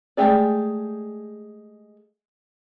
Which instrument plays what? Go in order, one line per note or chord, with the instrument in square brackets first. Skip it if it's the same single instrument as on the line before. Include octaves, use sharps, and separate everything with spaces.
[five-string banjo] G#3 A3 G4 G#4 D5